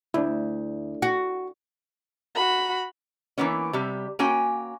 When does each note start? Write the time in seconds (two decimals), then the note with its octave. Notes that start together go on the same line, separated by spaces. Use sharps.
0.14 D2 D4 E4
1.02 F#4
2.35 F#4 B5
3.38 E3 F3 A#3 B3 C#4
3.73 C3 G3
4.19 A#3 C#4 F#4 G5 G#5